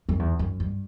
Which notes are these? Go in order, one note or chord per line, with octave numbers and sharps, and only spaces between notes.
F#2
E2
F#2
G2